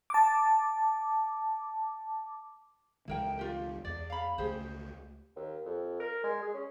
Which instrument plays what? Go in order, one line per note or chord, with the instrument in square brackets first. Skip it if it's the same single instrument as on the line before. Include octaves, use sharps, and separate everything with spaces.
[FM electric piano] A5 D6
[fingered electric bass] C#2 E3 G#3 [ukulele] E4 A#4 G5
[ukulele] F4 G4
[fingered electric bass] E2 [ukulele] D5
[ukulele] F5 B5
[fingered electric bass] C#2 A3 [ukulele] G4 G#4 C5
[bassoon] D#2
F2
A#4
G#3
G#4
C#4